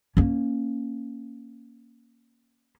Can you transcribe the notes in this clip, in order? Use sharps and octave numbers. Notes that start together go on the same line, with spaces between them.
A#3 C#4